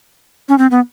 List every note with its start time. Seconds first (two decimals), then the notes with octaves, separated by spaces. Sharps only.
0.49 C#4
0.58 C4
0.71 B3